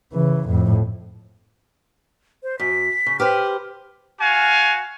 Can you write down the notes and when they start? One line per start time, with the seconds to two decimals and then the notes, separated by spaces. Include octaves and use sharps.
0.13 C#3 E3
0.48 F2 A2
2.43 C5
2.60 F#2 B6
3.06 C#3
3.20 G4 B4 C5 F6
4.20 F#4 F5 G#5